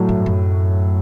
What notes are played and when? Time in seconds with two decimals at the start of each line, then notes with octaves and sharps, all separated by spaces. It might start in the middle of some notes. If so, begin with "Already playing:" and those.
Already playing: A2 F#3 A3
0.09 G2
0.26 F#2